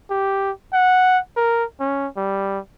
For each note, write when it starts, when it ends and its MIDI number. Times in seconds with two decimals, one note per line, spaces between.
0.10 0.51 67
0.73 1.19 78
1.37 1.64 70
1.80 2.07 61
2.17 2.59 55